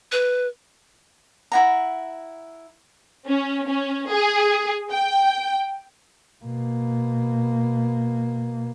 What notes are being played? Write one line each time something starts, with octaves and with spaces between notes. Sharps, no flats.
B4
E4 F#5 A#5
C#4
C#4
G#4
G5
B2 A#3